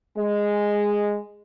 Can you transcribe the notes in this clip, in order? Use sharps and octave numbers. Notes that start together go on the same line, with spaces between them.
G#3